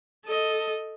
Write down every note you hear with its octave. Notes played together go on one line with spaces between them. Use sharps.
A4 D#5